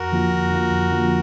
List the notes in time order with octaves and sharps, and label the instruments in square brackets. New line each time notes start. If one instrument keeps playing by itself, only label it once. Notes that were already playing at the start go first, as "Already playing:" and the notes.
Already playing: [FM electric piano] F2 [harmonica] F#4 A#4
[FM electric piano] D3 F3 A#3 F4
F2
D3 F3 A#3 F4
F2
D3 F3 A#3 F4